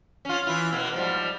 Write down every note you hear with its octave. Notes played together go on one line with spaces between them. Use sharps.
C#4 F4
E3 E4 F4
B2 A#3
G#2 F3 G3